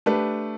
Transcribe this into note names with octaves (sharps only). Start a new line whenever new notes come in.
A3 D4 G4 B4